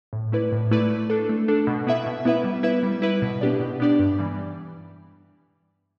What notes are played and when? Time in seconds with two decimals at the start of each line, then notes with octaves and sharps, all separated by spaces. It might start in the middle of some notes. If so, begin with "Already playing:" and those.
0.13 A2
0.32 A3 E4 B4 D5
0.52 A2
0.71 A3 E4 B4 D5
0.90 A3
1.10 D4 A4
1.29 A3
1.48 D4 A4
1.67 B2
1.87 B3 E4 B4 E5
2.06 B2
2.25 B3 E4 B4 E5
2.44 G3
2.63 E4 B4 E5
2.83 G3
3.02 E4 B4 E5
3.22 B2
3.41 B3 D4 G4 D5
3.60 B2
3.80 B3 D4 G4 D5
3.99 G2
4.19 E3 G3